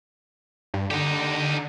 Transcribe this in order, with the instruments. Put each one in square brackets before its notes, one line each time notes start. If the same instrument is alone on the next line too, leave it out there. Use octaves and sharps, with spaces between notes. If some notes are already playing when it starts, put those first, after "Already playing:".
[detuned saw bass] G2
[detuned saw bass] D3 [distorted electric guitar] D#4 G4